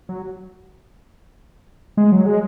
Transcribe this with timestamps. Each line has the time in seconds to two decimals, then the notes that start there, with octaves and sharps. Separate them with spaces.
0.09 F#3
1.97 G#3
2.12 F#3
2.26 G#3